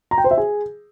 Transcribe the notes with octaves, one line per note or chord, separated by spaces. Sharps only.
A#5
G5
C5
E5
G#4